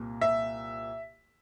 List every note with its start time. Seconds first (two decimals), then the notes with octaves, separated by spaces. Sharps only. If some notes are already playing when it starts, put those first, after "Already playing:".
Already playing: C2 A#2 A#3
0.21 E5